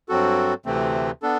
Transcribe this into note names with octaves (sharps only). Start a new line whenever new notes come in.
G2 F#3 C4 F#4 A4
D2 C3 E3 A3 C4
B3 D4 A4